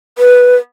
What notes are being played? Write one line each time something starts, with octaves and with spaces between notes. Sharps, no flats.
B4